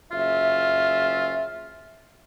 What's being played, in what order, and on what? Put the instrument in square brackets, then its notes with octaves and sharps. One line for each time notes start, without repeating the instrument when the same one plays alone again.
[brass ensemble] F#1 C#4 E5 [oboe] F4